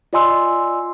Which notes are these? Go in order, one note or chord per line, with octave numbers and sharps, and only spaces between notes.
F4 D5 D#5 G#5 C6 E6